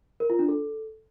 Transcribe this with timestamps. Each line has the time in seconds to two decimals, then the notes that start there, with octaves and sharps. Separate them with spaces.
0.20 A#4
0.30 F4
0.39 D4
0.49 A4